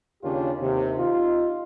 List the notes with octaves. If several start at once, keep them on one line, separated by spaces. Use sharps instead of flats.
D#2 C#3 D4 F4 G4
D#2 C3
D#4 F4